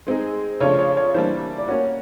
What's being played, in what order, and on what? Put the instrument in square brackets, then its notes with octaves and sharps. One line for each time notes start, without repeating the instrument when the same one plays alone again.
[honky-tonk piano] G#3 C4 D#4 G#4
[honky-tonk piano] C#3 F3 A3 D4 F4 [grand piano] C#5
[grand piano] C#5
C#5
[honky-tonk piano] E3 G3 A#3 D4 [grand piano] C5
[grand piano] D5
[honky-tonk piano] A#3 C#4 F#4 [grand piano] C#5